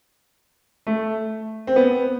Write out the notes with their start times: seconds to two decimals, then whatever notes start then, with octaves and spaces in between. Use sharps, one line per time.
0.87 A3
1.67 C4
1.76 B3